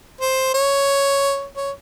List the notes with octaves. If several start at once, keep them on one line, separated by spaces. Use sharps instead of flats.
C5
C#5
C#5